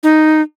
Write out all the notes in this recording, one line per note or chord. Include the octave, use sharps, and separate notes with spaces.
D#4